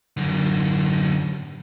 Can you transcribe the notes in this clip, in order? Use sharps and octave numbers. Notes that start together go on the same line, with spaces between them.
F#2 D3